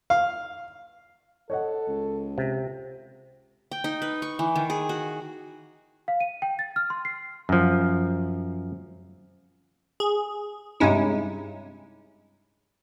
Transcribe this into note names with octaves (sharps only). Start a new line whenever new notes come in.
F5
A4 C#5 D#5 F#5
C#2
C3
G5
D#4
B4
C#6
E3
D#3
G#4
F#4
F5
D#7
G5
A6
F6
C6
C7
F#2 F3
G#4
G2 C3 G#3 C#4 D#4 E4